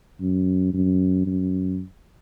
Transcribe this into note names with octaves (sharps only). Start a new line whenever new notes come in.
F#2
F#2
F#2